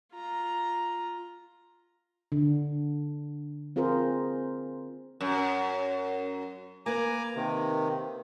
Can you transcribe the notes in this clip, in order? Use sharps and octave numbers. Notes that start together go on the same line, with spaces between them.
F4 A#5
D3
C4 F4 G#4 A#4 C5
F#2
A#3 B4 G#5 A#5 D6
C3 D#3